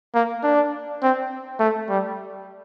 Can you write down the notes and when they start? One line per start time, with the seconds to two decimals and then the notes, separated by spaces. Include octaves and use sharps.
0.15 A#3
0.43 D4
1.02 C4
1.60 A3
1.89 G3